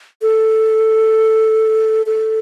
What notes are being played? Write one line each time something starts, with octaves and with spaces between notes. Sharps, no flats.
A4
A4